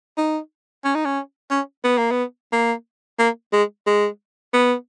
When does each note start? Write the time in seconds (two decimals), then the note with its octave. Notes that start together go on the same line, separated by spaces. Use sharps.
0.17 D#4
0.84 C#4
0.95 D#4
1.05 C#4
1.51 C#4
1.84 B3
1.98 A#3
2.11 B3
2.52 A#3
3.19 A#3
3.52 G#3
3.86 G#3
4.53 B3